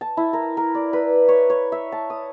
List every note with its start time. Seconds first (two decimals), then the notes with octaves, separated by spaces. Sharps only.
0.01 A5
0.17 E4
0.33 A#4
0.57 A#4
0.75 D5
0.93 B4
1.28 C#5
1.50 C#5
1.72 E5
1.92 A5
2.10 D#6